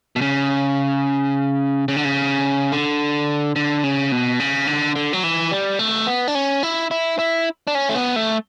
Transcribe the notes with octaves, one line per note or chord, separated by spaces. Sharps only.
B2
C#3
C#3
D3
C#3
D3
D3
C#3
B2
C#3
D3
D3
F#3
E3
G3
A3
B3
D4
C#4
E4
E4
E4
D4
C#4
A3
B3
A3